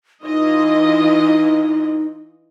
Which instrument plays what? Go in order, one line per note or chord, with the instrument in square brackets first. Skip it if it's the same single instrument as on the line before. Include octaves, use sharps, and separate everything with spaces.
[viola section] E3 F4 D#5 [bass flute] D#4